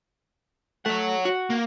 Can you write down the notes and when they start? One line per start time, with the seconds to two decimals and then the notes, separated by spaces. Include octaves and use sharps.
0.86 A3 C#5 F#5
1.25 F#4
1.50 A#3